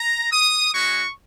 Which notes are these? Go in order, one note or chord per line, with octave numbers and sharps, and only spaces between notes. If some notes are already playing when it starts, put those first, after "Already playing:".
Already playing: A#5
D#6
G#3 C#4 F#4 C#6